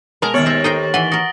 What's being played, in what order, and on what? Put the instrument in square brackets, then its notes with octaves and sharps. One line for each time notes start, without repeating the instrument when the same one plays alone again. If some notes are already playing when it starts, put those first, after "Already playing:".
[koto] B2 G#3 A5 [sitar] A#4
[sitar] D#2 C#5 [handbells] B3 F6 C#7 [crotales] A6 D7 F#7
[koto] C5 E5 [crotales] A6 A#6
[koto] D#4 C5 G5 [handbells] A4
[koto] E3 B4 [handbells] F#5 [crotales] G7
[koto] F#4 A#4 [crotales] D#6 A#6